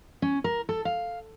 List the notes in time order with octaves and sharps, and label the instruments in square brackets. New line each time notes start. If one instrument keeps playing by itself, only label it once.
[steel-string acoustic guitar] C#4
A#4
A4
F5